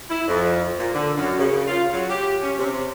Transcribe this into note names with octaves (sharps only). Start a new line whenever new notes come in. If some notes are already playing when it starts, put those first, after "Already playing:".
E4
F2
A#2
D3
F#2
C#3
F4
F#3
G4
C#4
C3